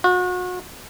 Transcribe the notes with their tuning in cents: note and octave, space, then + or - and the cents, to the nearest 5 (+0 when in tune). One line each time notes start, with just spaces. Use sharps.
F#4 -35